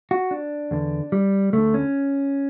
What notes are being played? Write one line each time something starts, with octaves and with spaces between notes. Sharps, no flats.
F#4
D4
E2 D3
G3
D2 D3 A3
C#4